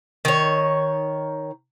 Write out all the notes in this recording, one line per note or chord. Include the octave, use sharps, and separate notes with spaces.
D#3 C#5